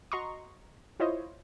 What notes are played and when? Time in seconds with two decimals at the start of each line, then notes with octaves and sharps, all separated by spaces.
0.12 F#4 D#5 A#5 C6 C#6
1.00 E4 F4 C5 C#5 D#5